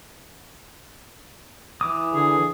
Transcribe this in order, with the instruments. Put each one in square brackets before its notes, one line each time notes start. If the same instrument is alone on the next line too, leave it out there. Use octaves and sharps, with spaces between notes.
[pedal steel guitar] E3 D6 D#6
[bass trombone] D3 [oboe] G#4